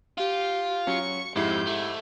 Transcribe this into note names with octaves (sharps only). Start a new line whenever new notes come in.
F4 G4
F#3 C#4 C#6 C#7
F2 G#2 E4 G4 G6 C7
A3